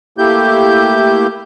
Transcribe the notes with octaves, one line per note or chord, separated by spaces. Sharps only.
A3 A#3 E4 G4 G6